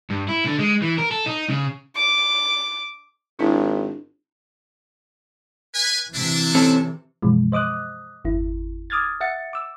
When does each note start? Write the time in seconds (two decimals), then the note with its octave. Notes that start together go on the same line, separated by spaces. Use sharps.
0.10 G2
0.28 E4
0.46 D3
0.59 G#3
0.82 E3
0.98 A#4
1.11 A4
1.26 D#4
1.50 C#3
1.96 D6
3.39 G#1 D4 E4
5.74 B4 G#5
6.13 C3 E3 D4 E4
6.55 C4 C#4 A4
7.22 F#2 B2 E3 F3 G#3
7.52 C5 D#5 D6 D#6 F#6
8.25 G1 E2 E4
8.90 D6 D#6 F6 G#6 A6
9.21 E5 F#5 A6 C#7
9.53 D6 E6